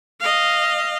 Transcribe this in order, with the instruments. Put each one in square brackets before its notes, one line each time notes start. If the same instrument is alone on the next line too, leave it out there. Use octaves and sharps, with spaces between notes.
[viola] D#5 F5